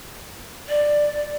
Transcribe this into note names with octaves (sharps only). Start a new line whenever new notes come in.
D5